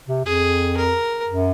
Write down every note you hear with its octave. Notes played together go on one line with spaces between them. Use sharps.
C3
F2 G#4
A#4
F#2